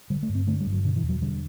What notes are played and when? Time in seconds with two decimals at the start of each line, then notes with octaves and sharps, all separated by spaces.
0.10 D3 G3
0.23 A3
0.29 G2
0.35 C4
0.47 D3 A3
0.60 G3
0.66 G2
0.72 F#3
0.84 B2 D3
0.96 E3
1.03 E2
1.09 F#3
1.22 D3 G3